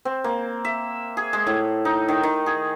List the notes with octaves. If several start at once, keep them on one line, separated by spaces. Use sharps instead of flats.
C4
A#3
E5
G#4
G#3
A2
D#4
D#3
D#3
G#4